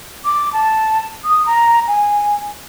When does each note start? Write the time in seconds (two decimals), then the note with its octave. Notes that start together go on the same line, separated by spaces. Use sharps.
0.25 D6
0.53 A5
1.24 D#6
1.46 A#5
1.88 G#5